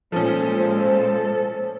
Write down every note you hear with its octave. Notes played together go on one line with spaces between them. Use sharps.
A#2 F3 G#3 A3 C#4 A4 C5